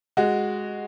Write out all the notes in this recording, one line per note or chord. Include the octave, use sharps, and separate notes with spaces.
G#3 F#4